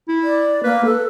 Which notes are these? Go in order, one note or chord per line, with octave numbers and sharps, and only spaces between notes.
E4
D5
A#3 B4
A4